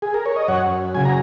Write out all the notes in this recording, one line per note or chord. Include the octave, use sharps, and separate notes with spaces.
G#4
A#4
C#5
D#5
F#2 C#5 F#5
C#3 F#3 G#5
A#5